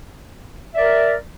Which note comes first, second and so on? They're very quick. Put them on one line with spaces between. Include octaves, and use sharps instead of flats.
E5 D5 A#4